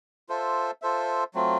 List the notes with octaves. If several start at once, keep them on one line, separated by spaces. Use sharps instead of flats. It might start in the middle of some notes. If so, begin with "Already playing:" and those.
F4 A4 C5 E5
F4 A4 C5 E5
F#3 A3 C4 F4